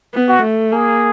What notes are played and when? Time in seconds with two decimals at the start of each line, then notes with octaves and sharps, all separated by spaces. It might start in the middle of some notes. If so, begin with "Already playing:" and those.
0.14 B3
0.28 F#4
0.43 A3
0.72 A#3 G#4